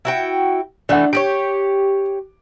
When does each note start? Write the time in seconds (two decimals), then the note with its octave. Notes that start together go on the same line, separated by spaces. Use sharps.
0.05 E4 F#4 G5
0.89 E3 A3 D4 F#5
1.13 G4 G#4 C#5 D7